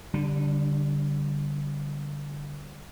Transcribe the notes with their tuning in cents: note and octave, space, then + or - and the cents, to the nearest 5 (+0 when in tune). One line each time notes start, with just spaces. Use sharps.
D3 -20 G3 +0 D4 +25